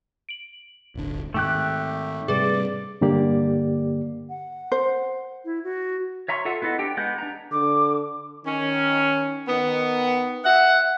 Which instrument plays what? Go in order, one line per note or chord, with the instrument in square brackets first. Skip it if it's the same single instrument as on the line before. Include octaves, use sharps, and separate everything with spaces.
[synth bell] D7 F#7
[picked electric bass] D1 G1 D3
[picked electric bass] G#2 D#3 [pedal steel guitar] A3 G4 F#6
[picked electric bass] G#2 C3 G3 [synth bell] G#4 B4 [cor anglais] D5
[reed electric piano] G2 D3 A#3 G4 D5
[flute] F#5
[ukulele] C5
[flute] E4
F#4
[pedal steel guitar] C#5 E5 A#5 C6 C#6
F4 A4 E5 F#5
B3 E4 A4 D#5
D4 G4 G5
G#3 B3 F#5 G6
D4 A#5
[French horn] D3 [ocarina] D6
[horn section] D#3 C#4
D#3 B3
E5 F#5